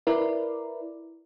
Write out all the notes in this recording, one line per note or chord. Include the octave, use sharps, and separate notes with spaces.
E4 A#4 B4 D5